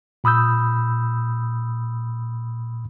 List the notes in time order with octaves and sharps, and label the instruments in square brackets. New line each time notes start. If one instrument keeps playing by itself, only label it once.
[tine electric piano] A#2 B5 D#6 E6 G6